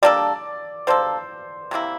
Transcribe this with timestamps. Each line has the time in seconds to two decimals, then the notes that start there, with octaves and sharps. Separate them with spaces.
0.02 G3 A#3 D4 A4 D5
0.87 G3 A#3 D4 A4 C5
1.71 C3 E3 A#3 E4